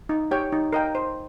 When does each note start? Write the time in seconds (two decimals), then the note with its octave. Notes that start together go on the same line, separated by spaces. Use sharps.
0.09 D#4
0.31 G4 C#5 G5
0.52 D#4
0.73 A#4 D#5 G5
0.95 C5